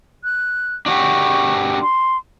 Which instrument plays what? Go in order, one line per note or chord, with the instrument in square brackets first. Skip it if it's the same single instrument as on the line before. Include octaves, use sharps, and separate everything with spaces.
[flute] F#6
[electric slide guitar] D4 F#4 G4 [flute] C#6
[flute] C6